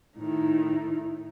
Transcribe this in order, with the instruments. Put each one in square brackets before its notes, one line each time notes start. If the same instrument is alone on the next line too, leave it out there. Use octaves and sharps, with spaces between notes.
[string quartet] A2 D#3 [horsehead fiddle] D#4 E4